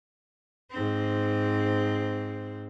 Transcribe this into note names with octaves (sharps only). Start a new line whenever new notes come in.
G#2 C4